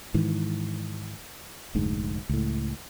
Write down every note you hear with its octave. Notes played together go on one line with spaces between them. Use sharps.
G#2 D#3 E3
F1 D2 G#2
C#2 A2